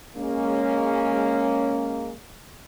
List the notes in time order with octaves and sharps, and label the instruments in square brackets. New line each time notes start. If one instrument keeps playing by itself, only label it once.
[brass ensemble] G#3 A#3 C#4